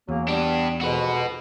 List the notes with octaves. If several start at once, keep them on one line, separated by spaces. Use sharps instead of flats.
E2 C#3 F#3 A#3
G3 B3 D4 G4
F2 G#2 B2 F#4 B4